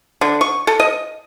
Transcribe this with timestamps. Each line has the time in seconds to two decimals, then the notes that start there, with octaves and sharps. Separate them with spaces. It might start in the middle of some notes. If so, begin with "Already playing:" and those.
0.21 D3
0.41 C#6
0.67 A4
0.80 D#5